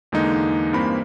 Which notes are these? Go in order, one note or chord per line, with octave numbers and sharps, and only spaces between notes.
E2 D3 G#3 A#3 D#4
G2 E3 A#3 C4 B5